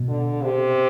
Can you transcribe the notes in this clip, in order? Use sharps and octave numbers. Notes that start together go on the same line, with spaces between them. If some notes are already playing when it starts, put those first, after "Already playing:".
Already playing: B2
D3
C3